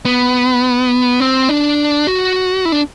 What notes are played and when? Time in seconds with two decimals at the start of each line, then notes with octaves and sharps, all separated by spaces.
0.05 B3
1.20 C4
1.49 D4
2.07 F#4
2.65 E4
2.72 D4